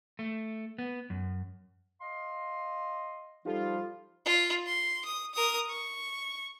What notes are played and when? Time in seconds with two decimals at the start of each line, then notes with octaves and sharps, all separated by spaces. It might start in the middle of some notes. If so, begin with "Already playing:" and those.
0.19 A3
0.79 B3
1.10 F#2
2.00 D#5 F5 C6
3.45 F3 G3 D#4 F4 G4 A4
4.26 F4
4.67 C6
5.05 D#6
5.34 A#4 D#6
5.70 C#6